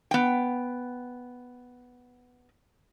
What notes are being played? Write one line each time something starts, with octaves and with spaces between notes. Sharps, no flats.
B3 G5